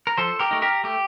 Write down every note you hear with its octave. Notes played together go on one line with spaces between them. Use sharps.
A#4
F3 A4 C5
G4 A#4
A3 D#4
G4 A#4
A3 G4